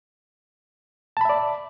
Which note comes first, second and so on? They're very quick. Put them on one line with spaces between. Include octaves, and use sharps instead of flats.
A5 B5 E5 D5